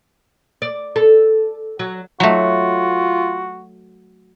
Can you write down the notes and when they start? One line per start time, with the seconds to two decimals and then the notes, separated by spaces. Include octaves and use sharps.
0.62 D5
0.96 A4
1.79 F#3
2.20 F#3 A3 F4 F#4